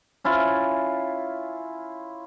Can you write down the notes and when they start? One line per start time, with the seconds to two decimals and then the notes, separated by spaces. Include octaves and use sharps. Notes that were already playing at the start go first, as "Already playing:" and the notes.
0.24 C#4 E4 F4